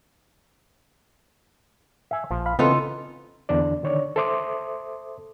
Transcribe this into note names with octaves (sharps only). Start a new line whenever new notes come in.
E5 G#5
A#1 F3
F5 B5
C#3 E3 B3 C4 D#4 F4 A4
E2 D3 D4 D5
D3 D#3 C#5 D5
A4 C5 E5 C6 D6 D#6